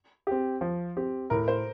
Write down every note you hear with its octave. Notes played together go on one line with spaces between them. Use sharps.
C4 G4
F3
C4 G4
A2 A#4
C5